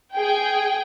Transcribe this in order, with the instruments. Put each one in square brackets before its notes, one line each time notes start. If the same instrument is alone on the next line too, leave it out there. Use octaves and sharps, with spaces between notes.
[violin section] G#4 G5